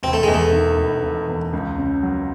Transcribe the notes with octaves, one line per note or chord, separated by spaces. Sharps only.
E1 C4
A3
E2 G#3
A3
D#3
E1
E1
E2
C#2
C#3
F#3